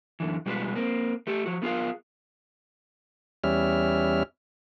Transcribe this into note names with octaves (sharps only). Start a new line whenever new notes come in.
F#2 D3 E3
B2 G3 G#3 F4 A#4 B4
A#3 C4
A3 G4 A4
F3 F#4
A3 B3 F4 G#4 A#4 F5
E2 G3 C#4 E5 F6